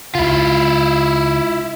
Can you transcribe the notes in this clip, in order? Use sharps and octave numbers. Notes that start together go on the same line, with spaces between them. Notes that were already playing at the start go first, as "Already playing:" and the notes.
C#2 C#3 E4 F4